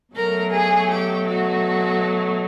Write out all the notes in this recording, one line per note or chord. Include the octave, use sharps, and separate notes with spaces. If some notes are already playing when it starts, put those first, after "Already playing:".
B2 F#3 A3 A#4
G#4
G4
F#4